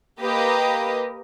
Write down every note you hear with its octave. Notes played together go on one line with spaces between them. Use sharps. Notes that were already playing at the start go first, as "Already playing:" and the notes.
A#3 G4 B4 D#5